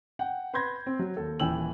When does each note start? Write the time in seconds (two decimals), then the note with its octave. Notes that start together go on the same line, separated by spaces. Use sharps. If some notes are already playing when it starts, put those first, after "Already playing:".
0.19 F#5 G5
0.54 B4 B5 C6 G6 G#6 A#6
0.86 C4
0.99 F#3
1.17 D#2 A4
1.40 D#1 E3 G5 G#5 E6 F#7